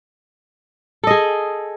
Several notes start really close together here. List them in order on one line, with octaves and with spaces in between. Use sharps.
A4 D#5 G#4